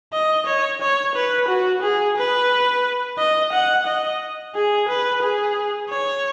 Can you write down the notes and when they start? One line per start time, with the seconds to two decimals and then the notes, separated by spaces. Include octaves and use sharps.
0.13 D#5
0.46 C#5
0.81 C#5
1.15 B4
1.48 F#4
1.83 G#4
2.17 B4
3.18 D#5
3.53 F#5
3.86 D#5
4.55 G#4
4.89 B4
5.22 G#4
5.90 C#5